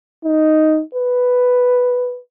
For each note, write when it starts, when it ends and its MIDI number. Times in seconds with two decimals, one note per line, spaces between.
0.24 0.82 63
0.94 2.20 71